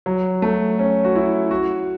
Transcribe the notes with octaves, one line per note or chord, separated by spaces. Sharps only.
F#3
A3
C#4
F#4
E4
F#4